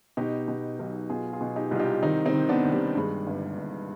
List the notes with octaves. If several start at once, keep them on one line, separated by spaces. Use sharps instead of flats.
B2 D#4 G4
B2
B1
B2 F4 G#4
F4 G#4
B2
D#4 G4
C2 F4
D#4 G4
D#3 C4 D#4
C4 D#4
D#3
B3 D4
D#2
G3 B3
G2 G#3
G1
G1